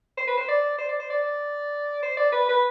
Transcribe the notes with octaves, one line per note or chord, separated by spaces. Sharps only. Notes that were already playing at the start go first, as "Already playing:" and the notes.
C5
B4
C5
D5
C5
D5
C5
D5
C5
D5
B4
B4